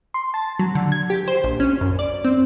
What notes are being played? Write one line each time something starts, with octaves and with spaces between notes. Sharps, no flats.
C6
A5
F#3
D3
G#6
G4
C5
A#1
C#4
F#2
D5
C4